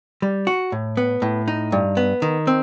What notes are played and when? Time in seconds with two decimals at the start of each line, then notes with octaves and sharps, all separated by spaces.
0.22 G3
0.47 F#4
0.72 A2
0.97 B3
1.22 A2
1.48 D#4
1.72 G2
1.97 B3
2.22 D#3
2.47 C4